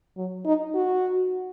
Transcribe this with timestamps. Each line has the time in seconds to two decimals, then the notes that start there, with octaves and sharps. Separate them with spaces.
0.17 F#3
0.46 D#4
0.75 F#4